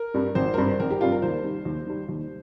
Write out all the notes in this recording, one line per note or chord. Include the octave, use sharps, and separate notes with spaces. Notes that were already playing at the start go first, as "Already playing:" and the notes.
Already playing: A#4
G2 G3
G#1 C5
A#4
G2 G3 C5
G#1 A#4
G4
G2 G3 F4
A#4
D#2 C5
D#3 G3
D#2
D#3 G3
D#2